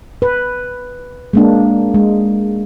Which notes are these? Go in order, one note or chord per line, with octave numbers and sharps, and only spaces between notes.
B4
G#3 A#3 D4
G#3